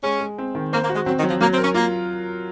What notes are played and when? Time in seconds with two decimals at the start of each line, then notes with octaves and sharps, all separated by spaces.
0.03 G#3 C#4
0.21 G#3
0.38 C4
0.55 D#3
0.73 A#3 C5
0.84 A#3
0.89 F#4
0.95 G#3
1.06 F#3 C4
1.18 D#3
1.23 F#3
1.30 F3
1.41 F#3 A#3
1.52 C4
1.58 A#4
1.63 C#4
1.74 A#3 F4